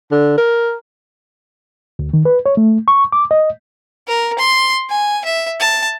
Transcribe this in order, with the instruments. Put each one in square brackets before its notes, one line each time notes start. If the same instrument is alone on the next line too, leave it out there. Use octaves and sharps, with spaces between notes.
[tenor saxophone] D3
A#4
[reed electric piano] D2
D#3
B4
C#5
A3
C#6
D6
D#5
[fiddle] A#4
C6
G#5
E5
A5